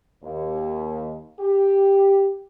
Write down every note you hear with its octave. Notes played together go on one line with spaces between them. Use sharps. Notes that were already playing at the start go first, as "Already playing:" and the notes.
D#2
G4